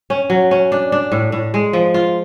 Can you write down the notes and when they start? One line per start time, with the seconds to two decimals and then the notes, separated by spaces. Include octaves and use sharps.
0.10 C#4
0.30 F#3
0.51 C#4
0.72 D4
0.92 D4
1.12 A2
1.32 A2
1.54 G#3
1.73 F3
1.94 F4